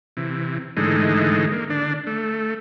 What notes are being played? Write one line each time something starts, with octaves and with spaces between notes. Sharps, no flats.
C3 E3
G#2 D3 E3 G#3 A3 D#4
A#3
D3 D4
A3